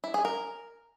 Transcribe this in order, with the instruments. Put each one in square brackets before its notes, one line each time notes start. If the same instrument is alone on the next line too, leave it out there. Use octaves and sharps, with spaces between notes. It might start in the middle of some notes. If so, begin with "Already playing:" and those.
[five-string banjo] E4
G#4
A#4